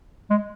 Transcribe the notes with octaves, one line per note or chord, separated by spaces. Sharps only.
G#3